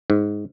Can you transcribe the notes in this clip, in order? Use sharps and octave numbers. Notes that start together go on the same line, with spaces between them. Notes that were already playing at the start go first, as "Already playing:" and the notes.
G#2